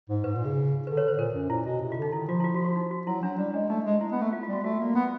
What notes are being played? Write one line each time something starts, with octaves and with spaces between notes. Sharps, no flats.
G#2
G#2 B4
A#2
C#3
D3 B4
B4 C#5
C5
A#2 A#4
F#2
A#2 E4
B2
C3
F4
D3
D#4
D#3 E4
F3 F4
E4
F4
F#4
F#4
D#4
F#4
F#3 E4
F#3 D4
G3 D4
G#3 D4
A3 D#4
G#3
E4
B3
A3
F4
F4
G3
F#4
A3 F#4
A#3
B3